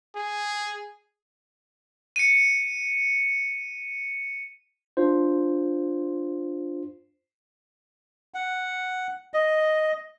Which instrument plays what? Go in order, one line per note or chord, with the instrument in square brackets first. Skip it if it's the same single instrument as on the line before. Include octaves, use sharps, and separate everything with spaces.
[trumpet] G#4
[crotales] C#7 D#7
[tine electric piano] D4 F4 C5
[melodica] F#5
D#5